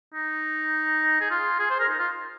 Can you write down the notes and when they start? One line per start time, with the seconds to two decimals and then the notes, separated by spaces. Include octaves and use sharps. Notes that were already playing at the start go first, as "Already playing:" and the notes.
0.14 D#4
1.21 G#4
1.31 F4
1.59 G#4
1.70 C5
1.80 A#4
1.89 D#4
1.99 F4